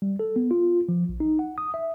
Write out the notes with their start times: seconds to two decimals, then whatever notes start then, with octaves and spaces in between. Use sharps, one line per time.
0.02 G3
0.19 A4
0.36 B3
0.51 F4
0.89 F3
1.09 A#1
1.20 D#4
1.39 F#5
1.58 D#6
1.74 E5